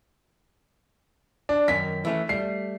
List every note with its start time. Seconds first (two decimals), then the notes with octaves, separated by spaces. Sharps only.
1.49 D4
1.68 F#2 D#3 C#4 B6
2.05 E3 A3 C#4
2.29 G3 A3 C7